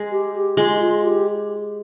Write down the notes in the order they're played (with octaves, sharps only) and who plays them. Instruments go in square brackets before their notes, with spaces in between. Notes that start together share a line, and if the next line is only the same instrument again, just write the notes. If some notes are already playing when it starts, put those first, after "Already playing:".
Already playing: [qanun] G#3
[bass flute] G4
G4
[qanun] G#3 [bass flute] F4
[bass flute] F4
G4